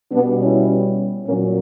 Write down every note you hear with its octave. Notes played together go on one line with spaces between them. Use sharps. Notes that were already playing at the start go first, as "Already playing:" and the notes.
B2 G3 B3 D4
C#4 E4
A#2 F#3 A#3 C#4